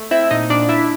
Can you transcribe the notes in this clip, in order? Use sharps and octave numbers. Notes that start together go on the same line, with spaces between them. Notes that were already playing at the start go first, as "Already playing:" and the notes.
Already playing: A3
C4 E4 E5
A#2 D#4 D#5
A#2 D4 D5
D4 E4 E5